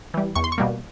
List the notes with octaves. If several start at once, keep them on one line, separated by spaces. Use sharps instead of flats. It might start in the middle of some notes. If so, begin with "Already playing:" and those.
E3 G3
E2 C#6
C6
C#6
B2 G3 A#3